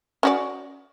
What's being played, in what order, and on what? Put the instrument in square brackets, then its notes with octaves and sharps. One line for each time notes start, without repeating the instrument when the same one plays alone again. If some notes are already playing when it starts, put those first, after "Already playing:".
[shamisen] C#4 F#4 D5